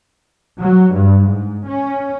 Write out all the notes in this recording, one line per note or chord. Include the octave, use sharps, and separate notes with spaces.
F#3
G2
G#2
C#4